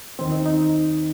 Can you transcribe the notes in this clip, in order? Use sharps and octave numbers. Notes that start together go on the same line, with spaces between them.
D#2 D#3 C4
D#4
D#4